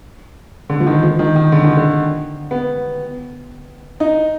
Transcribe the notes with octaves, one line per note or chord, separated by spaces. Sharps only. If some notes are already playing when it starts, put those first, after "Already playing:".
D3
F3
D#3
F3
D#3
D#3
D3
D#3
D3
B3
D#4